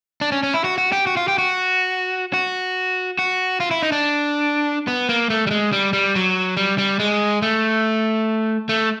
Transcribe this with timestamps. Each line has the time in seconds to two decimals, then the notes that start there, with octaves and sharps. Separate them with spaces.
0.21 D4
0.32 C#4
0.43 C#4
0.54 E4
0.64 F#4
0.78 F#4
0.92 G4
1.07 F#4
1.17 F4
1.28 G4
1.38 F#4
2.33 F#4
3.19 F#4
3.60 F4
3.71 E4
3.83 D#4
3.92 D4
4.87 B3
5.09 A#3
5.30 A3
5.47 G3
5.51 G#3
5.72 G3
5.93 G3
6.15 F#3
6.57 G3
6.78 G3
6.99 G#3
7.42 A3
8.69 A3